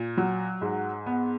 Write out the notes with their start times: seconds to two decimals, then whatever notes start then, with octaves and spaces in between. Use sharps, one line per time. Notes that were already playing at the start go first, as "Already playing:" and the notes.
Already playing: A#2
0.17 F#3
0.61 G#2
1.06 B3